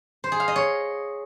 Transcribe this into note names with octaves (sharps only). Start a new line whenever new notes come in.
C5
G#4
F5
D#5
C#5